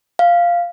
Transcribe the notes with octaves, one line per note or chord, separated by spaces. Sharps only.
F5